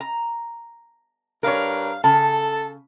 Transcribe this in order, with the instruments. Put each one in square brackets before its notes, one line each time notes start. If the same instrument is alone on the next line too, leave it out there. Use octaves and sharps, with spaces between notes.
[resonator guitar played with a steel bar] A#5
[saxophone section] G2 D4 F5 [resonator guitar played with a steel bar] A#4 C#5
[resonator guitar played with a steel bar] C#3 [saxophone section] A4 [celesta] A5